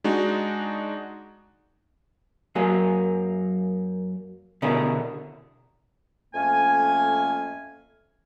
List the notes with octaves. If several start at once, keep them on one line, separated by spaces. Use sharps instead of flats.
G#3 D4 D#4 F#4
F#2 F#3 A#3 G#4
B2 D3 C#4 E4 G#4 A#4
F2 A3 A#3 C#4 G#5